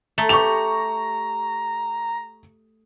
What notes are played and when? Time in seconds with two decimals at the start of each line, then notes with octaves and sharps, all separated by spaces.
0.18 A3 A#5
0.29 G4 A#5 C#6 F7